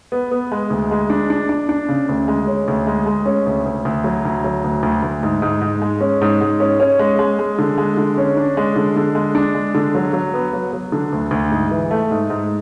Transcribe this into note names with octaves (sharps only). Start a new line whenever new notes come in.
B3
B3
G#3
D2
G#3
D4
D4
D4
D4
C#3
D2
G#3
C#4
D2
G#3
G#3
C#4
D2
D2
D2
F#3
D2
F#3
D2
D2
D2
G#2
G#2
G#2
G#3
C#4
G#2
G#2
C#4
C#4
G#3
G#3
G#3
D3
G#3
D3
C#4
D4
G#3
D3
D3
G#3
D4
G#3
D3
F#3
F#3
B3
F#3
F#3
D3
D2
D2
G#2
E3
A3
G#2
G#2